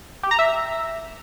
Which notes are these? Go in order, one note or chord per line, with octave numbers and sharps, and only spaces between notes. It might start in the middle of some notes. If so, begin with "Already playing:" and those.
G4
A#5
E5